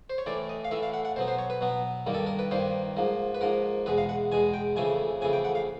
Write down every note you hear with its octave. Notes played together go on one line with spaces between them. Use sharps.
C5
C#5
A2 E3 A3 D5
D#5
F5
A2 E3 A3 E5
F5
F#5
F#5
B2 F#3 B3 C5
C5
C#5
B4
B2 F#3 B3
G2 D#3 G3 A#3
A4
A#4
B4
G2 D#3 G3 A#3 C5
G#2 F3 A#3
B4
G#2 F3 A#3 A#4
E2 B2 G#3 B4
F5
F#5
E2 B2 G#3 G#5
G5
F2 C#3 E3 A3 G#5
F2 C#3 E3 A3 G#5
G5
F#5
F5